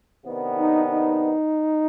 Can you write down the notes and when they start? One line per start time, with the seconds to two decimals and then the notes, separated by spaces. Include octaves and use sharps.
0.24 C3 D#3 B3 D4
0.59 D#4
0.93 D#4